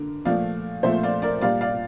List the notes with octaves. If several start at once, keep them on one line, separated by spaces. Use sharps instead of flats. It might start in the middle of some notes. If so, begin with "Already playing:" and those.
Already playing: D3 A#3
A#2 F3 A3 D5 F5
A#2 F3 A3 C5 E5
D5 F5
A#4 D5
A#2 G3 A#3 D5 F5
D5 F5